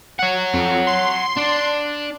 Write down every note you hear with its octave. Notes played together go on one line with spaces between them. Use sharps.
C#5 F#5
F2
C6
D4